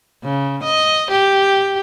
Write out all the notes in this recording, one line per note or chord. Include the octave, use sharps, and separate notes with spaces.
C#3
D#5
G4